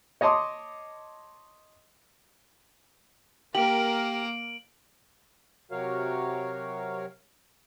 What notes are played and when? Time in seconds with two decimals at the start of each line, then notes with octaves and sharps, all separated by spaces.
0.21 C#5 D#5 A5 C6 D6 D#6
3.55 A#3 G4 A#4 D7 F#7
5.71 C3 F#3 F#4 A#4 C#5 F5